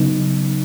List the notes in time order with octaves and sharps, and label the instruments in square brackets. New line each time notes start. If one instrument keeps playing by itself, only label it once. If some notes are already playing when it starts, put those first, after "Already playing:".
Already playing: [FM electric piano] C#3 F#3 B3 D#4